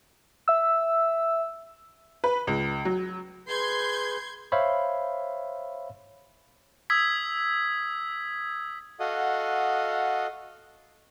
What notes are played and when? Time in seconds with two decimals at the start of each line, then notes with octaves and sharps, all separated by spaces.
0.48 E5 E6
2.24 B4
2.47 C#2
2.85 F#3
3.48 G#4 B4 C6 G6 G#6
4.52 C5 C#5 E5 F5 B5
6.90 D#6 E6 G#6 B6
9.00 F#4 A4 D#5 F5 F#5 D#6